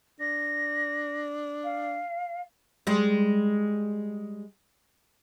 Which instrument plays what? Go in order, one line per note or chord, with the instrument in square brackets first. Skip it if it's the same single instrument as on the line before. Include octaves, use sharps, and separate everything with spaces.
[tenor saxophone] D4 [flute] A#6
[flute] F5
[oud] G3 G#3